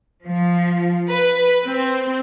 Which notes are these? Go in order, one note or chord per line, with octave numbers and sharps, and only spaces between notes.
F3
B4
C4